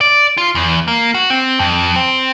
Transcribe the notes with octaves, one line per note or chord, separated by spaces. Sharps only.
D5
F4
E2
A#3
F#4
C4
F2
C4